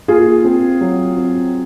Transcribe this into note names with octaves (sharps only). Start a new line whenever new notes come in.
A#3 F4 G#4
C4
F#3
C4